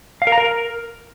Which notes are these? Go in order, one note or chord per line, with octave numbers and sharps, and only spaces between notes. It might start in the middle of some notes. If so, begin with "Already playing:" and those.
F5
A#4
A#5
A#4